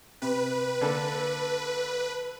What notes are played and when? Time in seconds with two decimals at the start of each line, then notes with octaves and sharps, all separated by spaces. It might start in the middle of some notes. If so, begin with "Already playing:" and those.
0.22 C3 B4
0.81 D3 A#3 A4